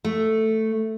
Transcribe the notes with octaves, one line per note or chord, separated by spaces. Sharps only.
A3